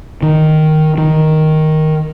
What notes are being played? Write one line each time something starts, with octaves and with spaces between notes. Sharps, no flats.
D#3
D#3